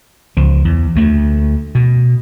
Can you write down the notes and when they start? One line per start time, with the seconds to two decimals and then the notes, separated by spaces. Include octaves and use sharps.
0.37 C#2 F3
0.65 E2
0.96 D2 A3
1.75 B2